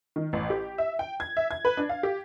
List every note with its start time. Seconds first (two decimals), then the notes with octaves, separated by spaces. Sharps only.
0.16 D#3
0.33 A1
0.50 G4
0.78 E5
0.99 G5
1.20 G#6
1.37 E5
1.51 G#6
1.65 B4
1.77 D4
1.89 F5
2.03 G4